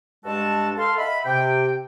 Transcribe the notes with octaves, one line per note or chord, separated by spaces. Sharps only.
G2 G#3 D4 F#4 A4 A5
A4 F5 C6
D#5 E5 F#5 B5
C3 G5